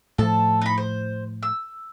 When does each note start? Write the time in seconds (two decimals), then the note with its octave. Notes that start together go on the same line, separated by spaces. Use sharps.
0.18 A2 F3 A4 A5
0.61 D#4 B5
0.78 C5
1.43 E6